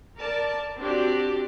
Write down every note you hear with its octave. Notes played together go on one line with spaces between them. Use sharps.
A#4 D5 A5
C4 D4 F#4 G4 D5